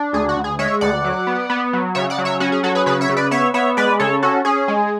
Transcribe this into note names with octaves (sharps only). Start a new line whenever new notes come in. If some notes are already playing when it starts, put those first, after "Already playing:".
Already playing: D4
D2 G#4
F#4
D2
G#4
G#3 C#5 E5
D2 D5 F#5
F#3
B3
B3
F#3
C#3 C#5 E5
D5 F#5
F#3
C#5 E5
C#4 F#4
G#4
F#3 F#4 A4
G#4 B4
C#3 G#4 B4
C#5 E5
C#3
B4 D5
B3 C#5 E5
B3 C#5 E5
G#3 B4 D5
C#3 A4 C#5
C#4 F#4 A4
C#4 G#4
G#3